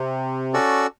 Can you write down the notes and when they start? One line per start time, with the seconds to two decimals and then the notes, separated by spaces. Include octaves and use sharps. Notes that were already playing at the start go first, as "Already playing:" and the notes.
Already playing: C3
0.53 C#4 F#4 A4 D5